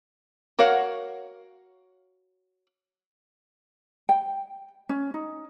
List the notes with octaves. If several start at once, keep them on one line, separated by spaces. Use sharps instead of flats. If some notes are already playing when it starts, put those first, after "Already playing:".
F#4 A#4 C#5 F5 F#5
G5
C#4
D#4